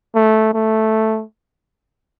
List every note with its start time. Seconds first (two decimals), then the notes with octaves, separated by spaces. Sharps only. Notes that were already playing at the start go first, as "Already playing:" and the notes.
0.15 A3
0.53 A3